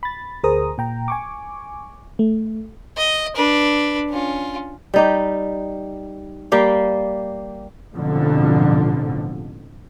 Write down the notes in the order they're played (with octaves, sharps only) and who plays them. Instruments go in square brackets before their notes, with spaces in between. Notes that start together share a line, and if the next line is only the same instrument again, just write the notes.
[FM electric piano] B5 A6
D2 G#4 A#4 C5 A#5 D#6
A#2 G5 A#5
G#5 C#6 D6
A3
[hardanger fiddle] D#5
D4 B4
C#4 F4
[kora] G3 D#4 G4
G3 A#3 G4 F5
[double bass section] A1 F2 G#2 B2 D3 F3